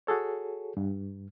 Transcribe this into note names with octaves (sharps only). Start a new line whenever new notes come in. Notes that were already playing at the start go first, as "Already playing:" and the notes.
F#4 G#4 A4 C#5
G2